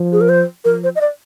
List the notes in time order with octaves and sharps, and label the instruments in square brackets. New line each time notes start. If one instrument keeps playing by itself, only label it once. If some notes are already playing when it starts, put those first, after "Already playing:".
Already playing: [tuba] F3
[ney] G#4
A#4
C5
[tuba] F3 [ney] A#4
[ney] C5
D#5
D5